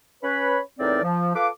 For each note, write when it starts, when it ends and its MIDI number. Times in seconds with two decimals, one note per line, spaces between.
0.22 0.58 61
0.22 0.58 71
0.22 0.58 73
0.22 0.58 83
0.79 1.02 40
0.79 1.02 45
0.79 1.02 60
0.79 1.02 63
0.79 1.02 70
0.79 1.02 74
1.03 1.30 53
1.35 1.48 65
1.35 1.48 69
1.35 1.48 71
1.35 1.48 77
1.35 1.48 86